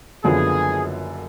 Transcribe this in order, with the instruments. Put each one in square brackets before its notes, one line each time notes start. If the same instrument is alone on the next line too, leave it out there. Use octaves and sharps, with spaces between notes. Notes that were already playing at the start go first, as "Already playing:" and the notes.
[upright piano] F#1 F#2 D3 F3 B3 [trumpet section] G#4